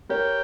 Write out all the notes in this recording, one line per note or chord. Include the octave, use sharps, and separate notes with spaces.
G4 A#4 C#5